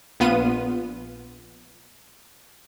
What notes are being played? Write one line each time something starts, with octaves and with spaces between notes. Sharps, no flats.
A#1 B3 F4 D#7